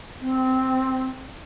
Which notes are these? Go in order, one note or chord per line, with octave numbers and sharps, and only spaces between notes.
C4